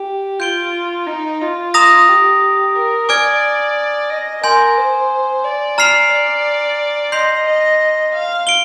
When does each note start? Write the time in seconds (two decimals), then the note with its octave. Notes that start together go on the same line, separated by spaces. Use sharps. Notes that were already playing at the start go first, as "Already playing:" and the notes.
Already playing: G4
0.39 F4 G6 D7 G7
1.07 D#4
1.41 F4
1.74 A#5 D#6 A#6 F7
2.08 G4
2.75 A#4
3.09 D5 G#5 D6 F6 G#6 D7
4.10 D#5
4.43 A#4 G#5 C6 G6
4.77 C5
5.44 D5
5.78 A#5 F6 C7 F7
6.12 D5
7.12 D#5 C6 G6 C7 F7
7.46 D#5
8.14 F5
8.47 D7 G7